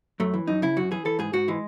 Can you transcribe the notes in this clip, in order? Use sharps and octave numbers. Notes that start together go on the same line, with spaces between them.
F#2 A3
E3
F#2 D#4
C#3 E4
F#2 F#4
E3 G#4
E3 A4
G#2 G#4
G#2 F#4
E3 G#3